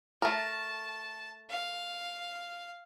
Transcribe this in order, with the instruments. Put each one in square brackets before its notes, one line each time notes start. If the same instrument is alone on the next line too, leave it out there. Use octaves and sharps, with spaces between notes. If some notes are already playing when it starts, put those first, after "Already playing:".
[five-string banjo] A3 A#4 [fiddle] A5
[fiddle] F5